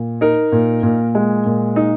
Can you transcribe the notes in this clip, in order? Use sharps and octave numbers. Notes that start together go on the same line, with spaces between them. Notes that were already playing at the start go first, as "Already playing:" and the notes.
Already playing: A#2
D#4 A#4
A#2
A#2
G#3
A#2
D#4